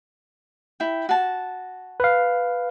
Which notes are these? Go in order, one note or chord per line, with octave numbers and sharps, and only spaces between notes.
E4 G5
F#4 A5
B4 F5